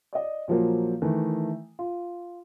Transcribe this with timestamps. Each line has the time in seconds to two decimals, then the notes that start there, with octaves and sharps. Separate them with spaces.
0.13 D5 D#5
0.48 A#2 F3 F#3 A#3
1.02 D#3 E3 A3
1.79 F4